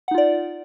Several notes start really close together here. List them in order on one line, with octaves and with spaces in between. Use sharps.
F#5 D#4 F4 D5